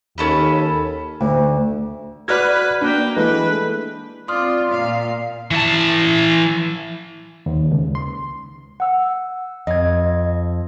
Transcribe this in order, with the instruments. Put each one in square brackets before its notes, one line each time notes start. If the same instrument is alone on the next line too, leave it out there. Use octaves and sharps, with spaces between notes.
[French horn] D#2 [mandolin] C#4 A4 B4
[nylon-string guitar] D2
[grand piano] F#4 [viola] B4 [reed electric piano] D5 F6 G#6
[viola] A#3 G5 [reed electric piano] D4
[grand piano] E3 G#3 A3 [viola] B4
[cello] C4 F4 [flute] D5 [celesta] C6 D#6 F6
[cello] A#2 F5
[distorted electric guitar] E3 A5
[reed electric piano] D#2
C#2
C6
[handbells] F#5 E6
[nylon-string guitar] F2 [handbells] D#5 G#6